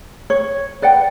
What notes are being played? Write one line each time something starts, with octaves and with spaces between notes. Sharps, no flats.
C#5
B4 D5 F#5 G5